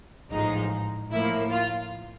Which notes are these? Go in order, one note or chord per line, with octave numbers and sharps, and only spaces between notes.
A1 G#2 F3 G#3 D#4
A2 F3 A#3 E4
F4